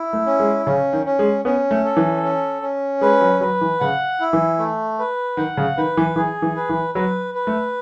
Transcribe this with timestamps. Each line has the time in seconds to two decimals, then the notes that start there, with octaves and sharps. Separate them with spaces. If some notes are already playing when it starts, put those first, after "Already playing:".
Already playing: E4
0.13 A3
0.26 C#4
0.40 G#3
0.66 C#3 C#4
0.93 D#3
1.06 C#4
1.19 G#3
1.45 B3 C#4
1.71 A3
1.85 A4
1.97 E3
2.23 C#4
2.62 C#4
3.01 G#3 B4
3.21 F#3
3.41 F#3 B4
3.61 E3
3.80 C#3 F#5
4.20 E4
4.33 E3
4.59 A3
4.99 B4
5.37 D#3 F#5
5.57 C#3
5.77 D#3 B4
5.97 E3
6.16 E3 G#4
6.42 E3
6.56 B4
6.69 E3
6.95 F#3 B4
7.34 B4
7.47 A3